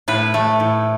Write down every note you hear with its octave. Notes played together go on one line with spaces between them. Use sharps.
A2 B4
A3
A2